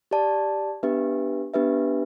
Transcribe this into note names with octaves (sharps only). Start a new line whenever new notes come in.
G4 D5 A5
B3 D4 G4 B4 E5
B3 D4 G4 B4 E5